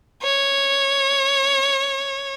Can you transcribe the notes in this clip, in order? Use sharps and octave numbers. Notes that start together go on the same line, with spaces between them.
C#5